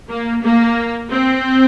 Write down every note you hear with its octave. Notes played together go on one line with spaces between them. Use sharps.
A#3
A#3
C4